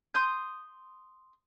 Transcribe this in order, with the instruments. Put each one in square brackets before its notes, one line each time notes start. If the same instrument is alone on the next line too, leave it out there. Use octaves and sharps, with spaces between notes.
[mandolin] C6 D#6 G6